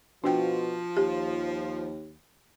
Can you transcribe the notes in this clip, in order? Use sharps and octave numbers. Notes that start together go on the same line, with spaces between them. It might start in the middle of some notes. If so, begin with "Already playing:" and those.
B2 F3 D4 F#4 G5
D#2 G4